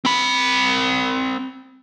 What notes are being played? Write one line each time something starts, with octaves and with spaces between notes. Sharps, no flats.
C4 B5